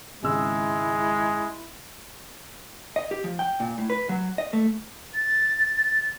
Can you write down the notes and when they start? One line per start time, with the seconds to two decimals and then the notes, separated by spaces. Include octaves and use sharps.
0.23 G#1 C#3 G#3 E4 E6
2.96 D#5
3.11 G4
3.24 F3
3.39 G5
3.60 A#2
3.78 A2
3.90 B4
4.09 F#3
4.38 D#5
4.53 A3
5.14 A6